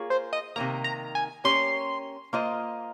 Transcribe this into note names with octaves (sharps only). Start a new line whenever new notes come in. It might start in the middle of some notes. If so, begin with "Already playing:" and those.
Already playing: A#3 F4 G#4 C#5
C5
D#5
C3 D#3 A#3 A#5
A#5
G#5
A#3 C#4 G4 C#5 C6
A#3 F4 C5 D#5